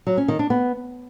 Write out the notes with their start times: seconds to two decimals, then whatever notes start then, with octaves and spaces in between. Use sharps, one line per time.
0.07 F#3
0.17 C#4
0.28 D#3
0.39 D4
0.50 B3